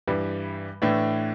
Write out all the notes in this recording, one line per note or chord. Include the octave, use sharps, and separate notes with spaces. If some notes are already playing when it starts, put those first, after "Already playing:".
G2 E3 G3
A2 E3 A3 D4